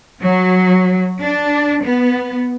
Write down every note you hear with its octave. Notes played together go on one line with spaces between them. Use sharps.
F#3
D4
B3